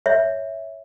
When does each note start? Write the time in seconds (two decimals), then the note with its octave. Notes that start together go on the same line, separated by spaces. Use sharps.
0.06 C#5 E5